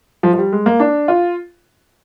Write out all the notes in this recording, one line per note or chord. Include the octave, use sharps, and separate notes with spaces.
F3
F3
G3
G#3
A#3
D4
F4